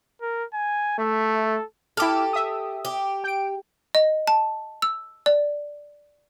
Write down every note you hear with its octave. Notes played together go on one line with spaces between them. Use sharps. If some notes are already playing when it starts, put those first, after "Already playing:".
A#4
G#5
A3 E5
A4
E4 G4 A4 D6 F6
E5 D#6
G4
G5 D7
D#5
A5
E6
D5